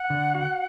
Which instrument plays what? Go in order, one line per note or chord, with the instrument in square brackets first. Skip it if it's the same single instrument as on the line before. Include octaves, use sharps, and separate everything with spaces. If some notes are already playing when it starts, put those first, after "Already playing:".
Already playing: [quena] F#5
[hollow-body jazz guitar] D3
F#4